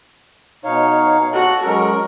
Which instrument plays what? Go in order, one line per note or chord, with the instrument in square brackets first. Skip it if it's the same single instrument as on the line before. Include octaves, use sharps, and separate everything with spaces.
[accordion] B2 D#4 F5 [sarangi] C#5
[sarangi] F#4 [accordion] A4
[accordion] F#3 G#3 C#4 [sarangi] A#4